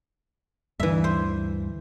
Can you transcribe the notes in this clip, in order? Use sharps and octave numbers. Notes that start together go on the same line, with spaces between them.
D2 G2 E3 E5
C5